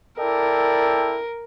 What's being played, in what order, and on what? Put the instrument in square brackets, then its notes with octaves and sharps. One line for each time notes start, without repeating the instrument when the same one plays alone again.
[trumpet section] E4 A4 D5 G5 [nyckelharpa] A#4